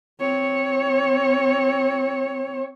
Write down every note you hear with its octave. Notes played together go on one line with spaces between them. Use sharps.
C4 C#5